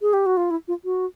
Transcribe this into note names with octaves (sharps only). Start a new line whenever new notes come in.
G#4
G4
F#4
F4
E4
F4
F#4